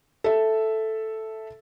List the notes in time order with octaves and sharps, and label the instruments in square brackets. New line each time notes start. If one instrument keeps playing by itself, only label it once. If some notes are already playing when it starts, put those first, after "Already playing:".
[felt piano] A4 E5